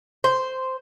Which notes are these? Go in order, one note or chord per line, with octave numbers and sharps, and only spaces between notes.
C5